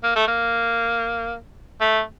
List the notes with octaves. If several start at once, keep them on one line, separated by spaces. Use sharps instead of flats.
A#3
A3
A#3
A3